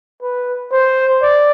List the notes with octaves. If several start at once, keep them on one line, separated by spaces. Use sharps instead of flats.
B4
C5
D5